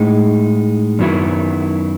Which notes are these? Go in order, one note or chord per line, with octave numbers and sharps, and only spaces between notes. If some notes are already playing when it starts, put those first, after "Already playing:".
Already playing: A2 G#3 D#4
F#2 D#3 F#3 B3 E4